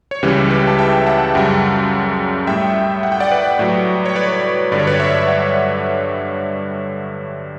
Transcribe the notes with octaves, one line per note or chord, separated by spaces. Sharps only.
C#5
C#2 C#3 E3 G3 G4 B4
G4 B4
A5
E5 G5
F#5 A5
F#2 C#3 G3
A2 G3 E5 G5
F#5
G5
D5 F#5
B4 D5
A2 F#3
C#5
B4 D5
G2 D3 G3 D5
C#5
B4 D5
C#5 E5
D5 F#5